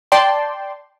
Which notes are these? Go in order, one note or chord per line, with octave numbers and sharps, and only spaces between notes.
D5 G5 A5 C6